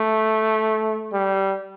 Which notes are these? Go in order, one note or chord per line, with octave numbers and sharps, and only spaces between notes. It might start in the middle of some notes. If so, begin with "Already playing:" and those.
Already playing: A3
G3